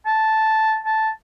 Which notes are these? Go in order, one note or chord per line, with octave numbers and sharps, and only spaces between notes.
A5
A5